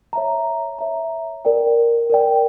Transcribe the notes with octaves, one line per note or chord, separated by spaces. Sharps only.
C#5 E5 A#5
C#5 E5 A#5
A#4 D5 G5
A#4 D5 G5